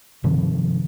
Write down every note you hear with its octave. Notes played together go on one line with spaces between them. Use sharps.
G2 C3 D#3 F3